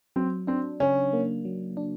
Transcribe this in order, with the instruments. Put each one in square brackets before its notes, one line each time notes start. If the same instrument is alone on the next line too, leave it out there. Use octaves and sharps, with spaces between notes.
[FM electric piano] F#3 [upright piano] C4
[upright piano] C4 [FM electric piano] D4
[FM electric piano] C#3 [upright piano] C#4
[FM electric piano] A#3
F#3
D4